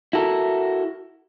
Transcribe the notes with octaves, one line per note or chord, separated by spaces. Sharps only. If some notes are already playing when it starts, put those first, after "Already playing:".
E4 F#4 A4 A#4